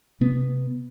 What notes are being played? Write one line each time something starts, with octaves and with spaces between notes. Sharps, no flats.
C3 B3